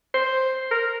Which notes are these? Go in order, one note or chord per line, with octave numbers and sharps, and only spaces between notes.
C5
A#4